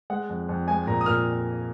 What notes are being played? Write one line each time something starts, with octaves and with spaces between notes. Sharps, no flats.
G#3 F#5
F2
F2
G#3 G#5
A#2 A#5
D#6
A#2 F6